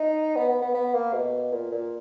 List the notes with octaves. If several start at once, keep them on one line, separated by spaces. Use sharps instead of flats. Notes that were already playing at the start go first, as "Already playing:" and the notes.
Already playing: D#4
B3
B3
B3
B3
A#3
B2
A#2
A#2